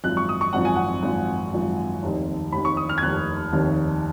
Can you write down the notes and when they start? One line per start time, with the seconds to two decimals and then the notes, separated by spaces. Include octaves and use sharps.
0.04 G#1 F#2 F3 F#6
0.17 C#6
0.29 D#6
0.41 C#6
0.53 G#1 F#2 F3 F#5
0.65 G#5
0.76 F#5
1.03 G#1 F#2 F3
1.53 G#1 F#2 F3
2.03 F1 D#2 D#3
2.52 F1 D#2 D#3 B5
2.65 C#6
2.77 D#6
2.89 F6
2.98 G#6
3.02 F1 D#2 D#3 F#6
3.53 F1 D#2 D#3